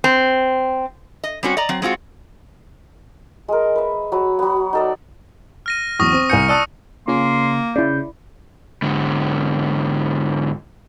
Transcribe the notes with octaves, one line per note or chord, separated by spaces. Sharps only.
C4
D#5
G3 C4 C#4 F#4
D5 D#5 A#5
F#3 C4
G#3 C4 F4 F#4
G#3 A#4
B4 E5
F#3 B5
F#3 B3
D#4 A4 D5
F6 A#6 D#7
E2 F#3 C#6 D#6 A#6
C4
C2 G#5 G6 C#7
D5 A5 D#6 E6 F#6 D#7
C#3 A#3 C#4 F4 C6
C#3 E4 D5 G6
G#2 D3